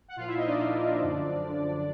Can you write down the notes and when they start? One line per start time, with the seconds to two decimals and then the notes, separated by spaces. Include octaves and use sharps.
0.08 F#5
0.16 A#2 F3 F4 F5
0.27 E4 E5
0.37 D#4 D#5
0.47 D4 D5
0.58 A#2 F3
0.99 F#2 D3 F3
1.40 F#2 D3 F3